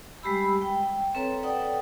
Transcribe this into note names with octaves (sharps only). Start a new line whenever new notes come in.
G3 G#3 G4 B5 E6
G5
C4 A4 B4 C#5 A#5
A4 B4 D5 F#5 G5 D#6